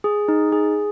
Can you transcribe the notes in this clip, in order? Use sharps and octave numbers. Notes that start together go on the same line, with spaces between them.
G#4
D#4
G#4